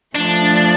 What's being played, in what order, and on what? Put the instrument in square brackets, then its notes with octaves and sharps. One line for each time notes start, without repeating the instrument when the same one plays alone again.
[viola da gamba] F3 A3 [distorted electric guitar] D4